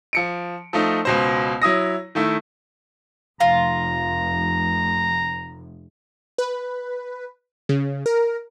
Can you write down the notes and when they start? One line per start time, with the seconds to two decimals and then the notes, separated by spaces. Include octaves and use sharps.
0.13 F3 C#7 D7
0.73 F3 A3 D#4
1.05 C#2 B2 C5
1.62 F#3 E4 D#6 A#6
2.15 D#3 A3 E4
3.40 F1 F4 A#5
6.38 B4
7.69 C#3
8.06 A#4